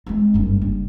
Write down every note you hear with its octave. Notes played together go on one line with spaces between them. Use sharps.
G#3 C4
F#1 G2
G2